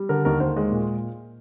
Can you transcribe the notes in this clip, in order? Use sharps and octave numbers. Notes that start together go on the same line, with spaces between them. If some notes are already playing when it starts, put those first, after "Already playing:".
Already playing: G3
D3 A#4
D#2 A#4
D#2 C5
G#3
A#2